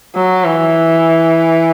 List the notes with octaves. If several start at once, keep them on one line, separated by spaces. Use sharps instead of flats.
F#3
E3